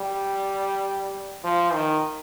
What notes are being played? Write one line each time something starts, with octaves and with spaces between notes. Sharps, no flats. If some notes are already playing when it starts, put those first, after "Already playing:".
Already playing: G3
F3
D#3